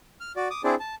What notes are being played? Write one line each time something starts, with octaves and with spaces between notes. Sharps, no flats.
F6
F#4 D5
D6 D#6
C4 D4 E4 G#4 C5 D5
A5